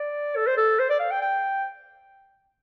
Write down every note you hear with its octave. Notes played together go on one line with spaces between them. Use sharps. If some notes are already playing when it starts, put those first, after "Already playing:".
Already playing: D5
A4
C5
A4
C5
D5
F5
G5
G5